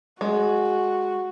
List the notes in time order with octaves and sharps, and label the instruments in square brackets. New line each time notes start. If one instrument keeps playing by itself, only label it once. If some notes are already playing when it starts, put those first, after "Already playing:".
[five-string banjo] G#3 [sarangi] F#4